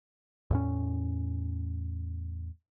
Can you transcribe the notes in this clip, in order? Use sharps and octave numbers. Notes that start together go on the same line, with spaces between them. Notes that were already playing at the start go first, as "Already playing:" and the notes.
E2 A2 C#4